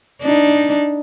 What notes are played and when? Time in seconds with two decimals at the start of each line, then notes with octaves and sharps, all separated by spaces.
0.22 D4 D#4